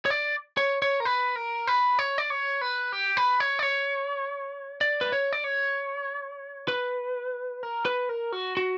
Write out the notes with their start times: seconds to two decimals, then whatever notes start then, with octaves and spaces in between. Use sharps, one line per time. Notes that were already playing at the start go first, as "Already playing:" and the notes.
0.06 C#5
0.10 D5
0.57 C#5
0.82 C#5
1.00 A#4
1.05 B4
1.36 A#4
1.67 B4
1.99 C#5
2.18 D5
2.30 C#5
2.61 B4
2.92 G4
3.17 B4
3.40 C#5
3.59 D5
3.63 C#5
4.81 D5
5.01 B4
5.12 C#5
5.33 D5
5.44 C#5
6.68 B4
7.63 A#4
7.85 B4
8.09 A#4
8.32 F#4
8.57 F#4